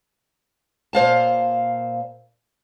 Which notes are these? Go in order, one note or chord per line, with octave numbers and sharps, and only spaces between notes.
A#2 C5 F5 A5